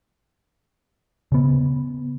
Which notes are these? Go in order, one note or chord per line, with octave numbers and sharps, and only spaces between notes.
C#3 B3